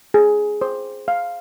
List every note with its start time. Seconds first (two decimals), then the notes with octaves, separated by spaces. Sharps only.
0.14 G#4
0.61 C5
1.08 F5